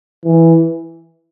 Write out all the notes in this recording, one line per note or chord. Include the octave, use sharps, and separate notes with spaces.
E3